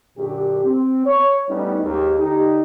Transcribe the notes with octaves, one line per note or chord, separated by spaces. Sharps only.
F#2 A#2 D3 G4
C4
C#5
A2 G3 B3 C#4 D#4
D#2 G#2 G4
D3 D#4 G4